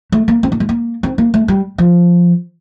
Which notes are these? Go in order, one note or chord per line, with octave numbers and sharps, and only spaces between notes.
A3
A#3
C4
A#3
A3
A#3
C4
A#3
A3
G3
F3